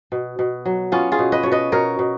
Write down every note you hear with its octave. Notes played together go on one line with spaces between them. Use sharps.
B2
B2
F#3
B3 C#4 F4
F4 G#4
B2
B4 D#5
B2 C#5
B4 D#5
B2 A#4 C#5
B2